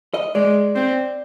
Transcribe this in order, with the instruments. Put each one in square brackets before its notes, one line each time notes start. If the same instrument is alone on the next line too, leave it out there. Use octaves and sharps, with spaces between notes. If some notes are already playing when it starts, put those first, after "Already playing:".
[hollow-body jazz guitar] D#5
[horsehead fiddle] G#3 [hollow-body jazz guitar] D5
[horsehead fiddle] C4